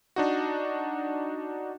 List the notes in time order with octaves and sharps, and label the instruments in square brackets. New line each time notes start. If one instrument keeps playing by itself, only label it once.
[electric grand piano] D4 D#4 F#4